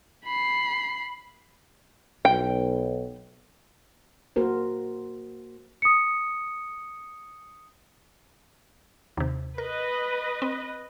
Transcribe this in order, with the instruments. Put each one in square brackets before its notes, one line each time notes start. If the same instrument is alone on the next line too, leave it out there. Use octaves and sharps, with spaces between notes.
[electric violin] B5 C7
[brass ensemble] B1 [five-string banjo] G5
[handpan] A#3 F#4 A#4 C5
[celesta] D#6 C#7
[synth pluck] D#2 C3
[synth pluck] A#4 [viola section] B4 D#5
[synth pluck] C4